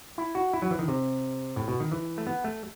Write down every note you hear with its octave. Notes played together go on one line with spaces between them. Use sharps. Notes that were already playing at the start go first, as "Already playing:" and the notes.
E4
F#4
E4
F#3
E3
D#3
C3
A2
B2
D#3
E3
A3
B3
A3